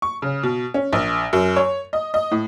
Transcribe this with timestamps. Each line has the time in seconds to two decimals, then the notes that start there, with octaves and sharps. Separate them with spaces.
0.02 C#6
0.22 C#3
0.43 B2
0.74 C#4
0.93 A#1
1.33 F#2
1.56 C#5
1.93 D#5
2.14 D#5
2.32 A2